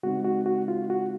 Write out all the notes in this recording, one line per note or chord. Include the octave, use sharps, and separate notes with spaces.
C#3 G#3 C4 D#4 F#4
F#4
F#4
F4
F#4